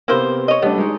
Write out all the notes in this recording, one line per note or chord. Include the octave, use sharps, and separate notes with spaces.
C3 A#3 B3 E4 C5
C#5 D#5
G3 A3 B3 D4
G#3 D#4